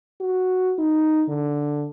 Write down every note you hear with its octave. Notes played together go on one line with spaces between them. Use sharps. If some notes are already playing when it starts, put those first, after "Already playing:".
F#4
D#4
D3